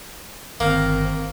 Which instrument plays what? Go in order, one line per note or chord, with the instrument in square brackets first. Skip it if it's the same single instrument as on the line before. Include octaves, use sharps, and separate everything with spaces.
[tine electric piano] G1 F6 [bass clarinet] D#3 [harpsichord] A#3 [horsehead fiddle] C4 A#4